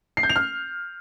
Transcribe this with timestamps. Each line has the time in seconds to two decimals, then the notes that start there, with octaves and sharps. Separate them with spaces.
0.17 C7
0.23 G6
0.29 F7
0.36 F6